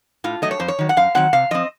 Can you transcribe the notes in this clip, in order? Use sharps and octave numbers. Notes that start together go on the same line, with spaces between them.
A2 F4
F#3 A3 D#5
C#5
F2 C5
C#5
D#3 F#3
F#5
F#2 F5
D#3 F#3 C4 F#5
C3 F5
F3 C4 D#5